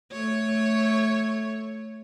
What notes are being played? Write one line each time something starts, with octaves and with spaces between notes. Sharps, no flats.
A3 C#5